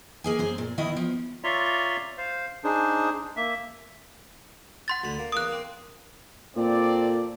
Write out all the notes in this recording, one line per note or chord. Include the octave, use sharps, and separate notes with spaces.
A#3 G#4 G#5
F#2 G#4 C5
A#2
E2 D#3 E4 D#5
F3
F4 C#5 D5 E5 A#5 C6
C5 F5
D4 D#4 G#4 C5
A#3 E5
F#5 C6 A6
D2 D3 B5
A#3
E2 A#3 D6 D#6 F#6
A#3 C4
A#2 C4 A4 D5